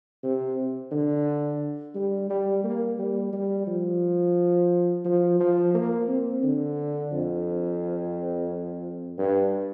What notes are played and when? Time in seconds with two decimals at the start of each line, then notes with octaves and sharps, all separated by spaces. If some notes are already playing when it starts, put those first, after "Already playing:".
0.23 C3
0.92 D3
1.95 G3
2.30 G3
2.64 A#3
2.99 G3
3.33 G3
3.67 F3
5.05 F3
5.40 F3
5.75 A#3
6.08 C4
6.43 D3
7.12 F2
9.19 G2